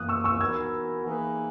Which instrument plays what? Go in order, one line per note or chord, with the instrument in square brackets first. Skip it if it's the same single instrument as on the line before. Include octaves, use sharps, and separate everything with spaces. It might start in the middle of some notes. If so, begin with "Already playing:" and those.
Already playing: [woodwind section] F#2 E3 A#3 [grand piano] D#6 F#6
[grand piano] C#6 E6
C#6 E6
[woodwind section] E3 B3 D#4 F#4 A#4 [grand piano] E6 G#6
[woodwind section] E3 A#3 D#4 G#4 B4